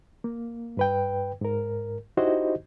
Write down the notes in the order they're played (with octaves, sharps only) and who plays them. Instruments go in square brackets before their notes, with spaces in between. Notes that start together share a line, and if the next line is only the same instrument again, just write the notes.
[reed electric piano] A#3
G2 B4 G5
G#2 A#4
D#4 E4 F#4 G4 C5 D#5